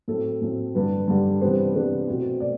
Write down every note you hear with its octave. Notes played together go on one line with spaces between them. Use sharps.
A2 F#3 C4 A4
A2 F#3 C4
G2 D3 G3 B4
G2 D3 G3
C3 E3 G3 B3 D4 C5
C3 E3 G3 B3 D4
B2 F#3 A3 C4
B2 A3 D5